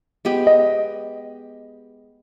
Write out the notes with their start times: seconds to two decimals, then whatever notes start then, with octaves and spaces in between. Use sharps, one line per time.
0.25 G#3 B3 G4
0.47 D#5